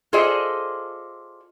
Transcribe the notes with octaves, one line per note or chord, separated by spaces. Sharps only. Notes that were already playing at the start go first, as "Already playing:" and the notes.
F4 G#4 A4 C5 D5 D#5